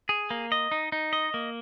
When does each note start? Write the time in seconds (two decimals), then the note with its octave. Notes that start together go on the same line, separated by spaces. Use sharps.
0.09 G#4
0.31 A#3
0.52 D#5
0.72 D#4
0.92 D#4
1.13 D#5
1.34 A#3